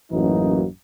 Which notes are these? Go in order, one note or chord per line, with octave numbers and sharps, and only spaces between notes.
A1 F#2 E3 F#3 A#3 D#4